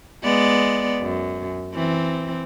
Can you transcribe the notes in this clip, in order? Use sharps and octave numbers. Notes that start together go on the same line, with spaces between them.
G#3 B3 D5
F#2
E3 C4